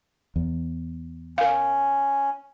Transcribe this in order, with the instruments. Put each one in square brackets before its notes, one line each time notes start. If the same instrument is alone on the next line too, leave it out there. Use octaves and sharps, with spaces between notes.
[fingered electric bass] E2
[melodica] C#4 [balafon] A#4 F5